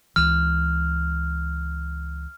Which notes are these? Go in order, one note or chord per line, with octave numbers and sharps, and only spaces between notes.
C#2 E3 F6